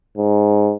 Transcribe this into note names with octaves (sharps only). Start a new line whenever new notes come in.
G#2